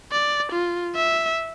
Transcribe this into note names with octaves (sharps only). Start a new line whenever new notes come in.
D5
F4
E5